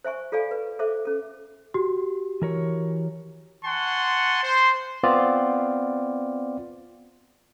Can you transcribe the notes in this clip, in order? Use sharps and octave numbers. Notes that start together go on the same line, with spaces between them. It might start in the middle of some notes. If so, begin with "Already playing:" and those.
C5 E5 G#5 C#6
F4 A4 D5 F5 G#5
B4
A4 C5 E5 D6
C#4 A4
F#4 G4
E3 A#4 C#5
F#5 G#5 A5 C6 C#6
C5
B3 C4 F4 D5